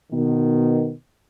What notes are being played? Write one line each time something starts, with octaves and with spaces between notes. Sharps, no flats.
B2 D#3